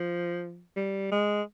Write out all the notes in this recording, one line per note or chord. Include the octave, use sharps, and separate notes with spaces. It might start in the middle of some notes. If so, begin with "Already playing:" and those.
Already playing: F3
G3
G#3